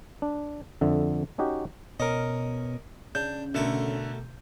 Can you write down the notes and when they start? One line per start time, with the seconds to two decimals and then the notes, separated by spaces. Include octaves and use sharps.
0.22 D4
0.81 F2 D3 E5
1.38 C#4 D#4 F#4 G4
2.00 B2 C#4 A#4 D#5
3.15 C#3 D4 G6
3.54 B2 D3 A3 A#4